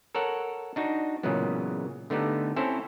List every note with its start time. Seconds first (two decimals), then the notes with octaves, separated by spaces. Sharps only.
0.15 A4 A#4 C#5 F#5
0.76 D4 D#4 F#4
1.23 A#2 C#3 E3 F#3 G#3 B3
2.10 D3 A3 B3 D#4 G4
2.56 C4 C#4 E4 A4 C5 C#5